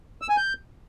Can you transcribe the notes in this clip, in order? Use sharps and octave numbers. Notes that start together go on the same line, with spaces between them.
E6
G#5
G6